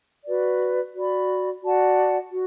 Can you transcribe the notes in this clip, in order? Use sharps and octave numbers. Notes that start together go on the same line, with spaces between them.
F#4 B4 D5
F#4 D5 B5
F#4 D5 F#5 A5
F#4